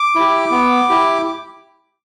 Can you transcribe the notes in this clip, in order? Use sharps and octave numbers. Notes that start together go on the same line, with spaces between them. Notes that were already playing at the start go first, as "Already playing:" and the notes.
Already playing: D6
E4 G4
B3
E4 G4